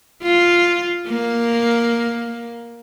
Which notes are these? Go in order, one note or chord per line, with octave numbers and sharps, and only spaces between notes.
F4
A#3